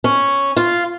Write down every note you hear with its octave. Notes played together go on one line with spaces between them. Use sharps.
C#4
F4